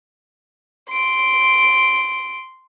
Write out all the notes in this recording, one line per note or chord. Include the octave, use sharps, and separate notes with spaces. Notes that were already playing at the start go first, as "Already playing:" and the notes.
C6 D7